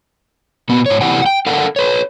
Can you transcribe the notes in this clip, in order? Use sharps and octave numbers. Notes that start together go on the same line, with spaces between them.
A#2 B3
G#2 C#5
C3 E3 G4 D5 F#5 G#5
F#5 G5
A4 A#4 D5 F5 F#5
B4 C#5